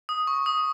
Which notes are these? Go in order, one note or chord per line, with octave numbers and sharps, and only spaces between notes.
D#6
C#6
D#6